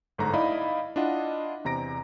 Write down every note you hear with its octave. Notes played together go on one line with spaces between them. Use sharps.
G1 G#2 A3 A#5
D#4 E4 D5 D#5 F5 B5
D4 E4 F4 D#5 F#5
E2 C3 A#5 A#6 D7